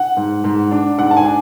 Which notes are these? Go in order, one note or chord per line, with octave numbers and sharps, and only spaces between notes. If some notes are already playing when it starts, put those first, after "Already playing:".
Already playing: F#5
G#2
G#2
D4
G#2 F#5
A5
G#5
D4